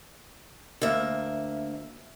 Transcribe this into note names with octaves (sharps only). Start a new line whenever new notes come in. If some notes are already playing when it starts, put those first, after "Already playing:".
D2 A#3 E5